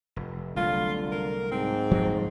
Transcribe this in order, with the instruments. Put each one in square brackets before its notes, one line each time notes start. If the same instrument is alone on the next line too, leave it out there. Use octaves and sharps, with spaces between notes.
[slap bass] F1
[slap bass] C2 F#3 A3 [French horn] D3 [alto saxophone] F4
[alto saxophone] A#4
[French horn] G#2 [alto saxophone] C4
[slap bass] F3 F#3 A3